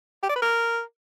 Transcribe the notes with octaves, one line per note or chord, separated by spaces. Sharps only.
G4
D5
B4
A#4